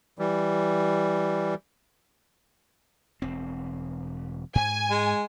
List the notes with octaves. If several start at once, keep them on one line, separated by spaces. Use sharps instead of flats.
E3 G3
E1 C4
G#2 G#5
G#3